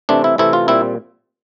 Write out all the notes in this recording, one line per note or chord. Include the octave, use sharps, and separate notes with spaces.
C3 E3 A3 C4 D4
E4
C3 E3 A3 C4 E4
F4
A#2 G3 C4 E4